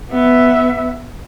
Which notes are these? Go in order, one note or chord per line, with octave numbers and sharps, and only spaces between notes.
B3 E5